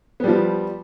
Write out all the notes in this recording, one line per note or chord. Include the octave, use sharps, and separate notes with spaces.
F3 G3 B3